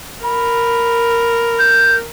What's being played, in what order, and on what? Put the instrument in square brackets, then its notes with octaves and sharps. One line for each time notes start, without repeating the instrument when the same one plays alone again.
[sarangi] A#4 [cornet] B5
[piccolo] G6